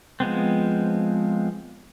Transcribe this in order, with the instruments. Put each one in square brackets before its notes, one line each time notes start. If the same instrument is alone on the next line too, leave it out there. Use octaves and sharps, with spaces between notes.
[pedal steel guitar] F3 G#3 B3 C4